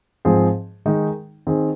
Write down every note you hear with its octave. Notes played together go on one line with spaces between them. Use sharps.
G#2 F3 C4 G#4
D#3 G#3 D#4 G#4
D#3 C4 G#4